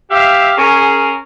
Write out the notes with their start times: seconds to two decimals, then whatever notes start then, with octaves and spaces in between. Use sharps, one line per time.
0.11 G4 E5 F5
0.57 C#4 G#4 A#4